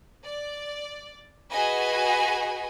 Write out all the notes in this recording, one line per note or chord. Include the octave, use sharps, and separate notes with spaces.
D5
F#4 G#4 B4 D#5 G#5